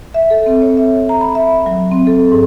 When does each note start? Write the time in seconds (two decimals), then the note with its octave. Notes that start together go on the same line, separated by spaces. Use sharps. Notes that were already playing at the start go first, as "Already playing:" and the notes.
0.14 E5
0.30 A4
0.46 C4
0.62 C#5
0.77 E5
1.09 A#5
1.21 B5
1.35 E5
1.66 F#3
1.91 C4
2.07 A4
2.32 G#2